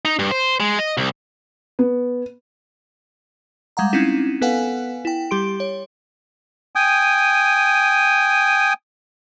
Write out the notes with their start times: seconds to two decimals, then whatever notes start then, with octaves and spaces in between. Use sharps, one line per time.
0.05 D#4
0.19 G2
0.31 C5
0.60 G#3
0.79 D#5
0.97 C2
1.79 B3
3.77 G3 G#3 F5 F#5 A#5
3.93 C4 C#4 D#4 E4
4.41 B3 A4 B4 F5 F#5 G#5
5.05 E4 G5
5.31 G3 G4 C6 D7
5.60 C#5
6.75 G5 G#5 D#6